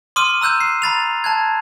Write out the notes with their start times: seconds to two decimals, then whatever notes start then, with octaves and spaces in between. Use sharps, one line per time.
0.16 C6 D6 D#6 F6 D#7
0.41 A#5 E6 F#6 G6 E7
0.60 C7
0.82 A#5 B5 A6 F7
1.24 A5 F#6 G#6